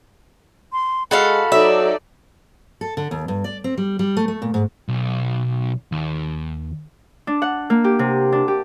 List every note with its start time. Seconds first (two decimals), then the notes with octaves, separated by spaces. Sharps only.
0.73 C6
1.11 G#3 F#4 A4 F5 B5
1.52 F#3 D#4 A4 D5 E5
2.81 A4
2.97 D3
3.11 D#2
3.28 G2
3.44 D5
3.64 C4
3.78 G3
3.99 G3
4.17 A3
4.28 A3
4.42 A#2
4.54 G#2
4.88 B1
5.92 D#2
7.27 D4
7.42 F#5
7.70 A#3
7.84 G4
7.99 C3
8.32 D4
8.48 G4